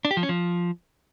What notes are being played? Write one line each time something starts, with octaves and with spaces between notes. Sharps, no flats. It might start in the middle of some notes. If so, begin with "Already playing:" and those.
D4
G4
F3
C#4
F3